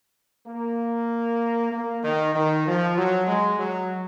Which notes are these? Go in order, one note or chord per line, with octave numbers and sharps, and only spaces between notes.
A#3
A#3
D#3
D#3
F3
F#3
G#3
F#3